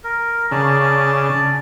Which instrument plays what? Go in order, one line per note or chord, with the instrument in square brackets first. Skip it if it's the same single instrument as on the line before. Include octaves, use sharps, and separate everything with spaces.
[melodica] A#4
[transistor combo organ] C#3 [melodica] D5 A5